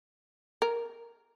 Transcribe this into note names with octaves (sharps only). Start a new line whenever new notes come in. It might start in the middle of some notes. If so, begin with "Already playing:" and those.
A#4